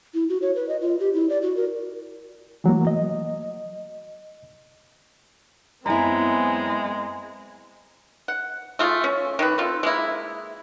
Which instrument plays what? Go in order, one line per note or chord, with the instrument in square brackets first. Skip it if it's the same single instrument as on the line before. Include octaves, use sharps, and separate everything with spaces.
[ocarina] E4
F#4
C#5
B4
D#5
F4
G4
E4
D5
F#4
A#4
[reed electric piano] E3 F#3 A3 A#3
D#5
[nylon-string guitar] F#2 E4 [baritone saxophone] G#3 [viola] B3 C4 [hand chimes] G#5 A#5
[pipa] F#5
A3 F4 G#4
C#4
D#3 E3 B4
C4 F4 A4
G#3 A#3 E4